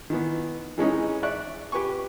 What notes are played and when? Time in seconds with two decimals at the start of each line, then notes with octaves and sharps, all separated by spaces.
0.10 D#3 E3 B3
0.78 E3 G#3 C#4 D#4
1.23 D5 E5 C#6 F#6
1.72 G4 B4 G#5 C#6